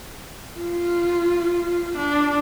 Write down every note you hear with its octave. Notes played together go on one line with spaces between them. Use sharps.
F4
D4